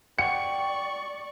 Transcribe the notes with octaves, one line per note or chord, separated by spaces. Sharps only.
B4 D5 F#5 G5 C#6 C#7